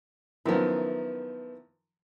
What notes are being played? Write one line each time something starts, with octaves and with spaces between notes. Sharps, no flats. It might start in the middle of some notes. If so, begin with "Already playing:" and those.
F#2 D#3 F3 B3 E4